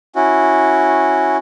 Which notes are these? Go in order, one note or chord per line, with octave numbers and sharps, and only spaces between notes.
C#4 E4 F#4